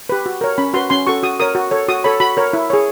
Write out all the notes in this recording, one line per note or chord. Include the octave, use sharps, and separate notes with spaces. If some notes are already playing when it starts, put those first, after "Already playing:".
G4 B4
F#4
A#4 C#5
C#4 B5
F#4 B4 C6
C#4 C6
F#4 A4 C#6
F#4 D#6
A#4 C#5 D#6
F#4
A4 C#5
F#4 D#6
A4 C#5 B5
F#4 B5
A#4 C#5
E4
G#4 C#5